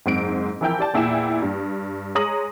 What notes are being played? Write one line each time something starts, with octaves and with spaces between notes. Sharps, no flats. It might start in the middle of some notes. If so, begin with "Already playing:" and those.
F#1 G#2 C4 D7
E3 F3 E4 A#4 G5 G6
G4 D5 A5
E2 A#2 E4 G5 G#5 E7
G2
G#3 C#5 A#5 D#6 A#6 F#7